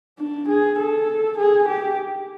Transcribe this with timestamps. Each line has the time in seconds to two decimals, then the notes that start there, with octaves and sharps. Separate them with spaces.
0.18 D4
0.49 G#4
0.79 A4
1.38 G#4
1.68 G4